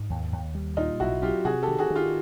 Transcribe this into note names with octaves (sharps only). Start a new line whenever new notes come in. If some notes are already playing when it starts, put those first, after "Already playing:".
Already playing: G#2
D#2
D#2
G3
A#2 D#4 F4
B1 E4 F#4
F#3 F4 G4
C3 F#4 G#4
G4 A4
D#3
F#4 G#4
D#3
F4 G4